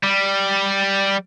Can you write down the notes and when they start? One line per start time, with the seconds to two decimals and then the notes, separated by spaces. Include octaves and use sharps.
0.03 G3